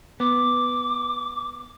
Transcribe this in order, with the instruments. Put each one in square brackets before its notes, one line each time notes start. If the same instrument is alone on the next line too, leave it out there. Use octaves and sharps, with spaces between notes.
[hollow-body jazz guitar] B3 [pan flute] D6